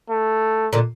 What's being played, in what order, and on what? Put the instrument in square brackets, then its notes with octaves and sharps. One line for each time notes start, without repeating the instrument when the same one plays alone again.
[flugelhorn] A3
[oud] A#2 D3